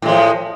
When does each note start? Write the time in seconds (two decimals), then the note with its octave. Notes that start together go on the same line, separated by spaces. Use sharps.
0.02 A2
0.05 G#3
0.08 F3